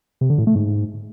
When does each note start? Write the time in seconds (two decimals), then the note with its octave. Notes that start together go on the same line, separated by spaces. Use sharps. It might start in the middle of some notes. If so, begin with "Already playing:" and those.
0.21 C3
0.30 D3
0.38 A2
0.47 A3
0.55 G#2